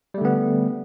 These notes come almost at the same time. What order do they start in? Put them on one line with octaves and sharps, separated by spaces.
G3 A3 D3 B3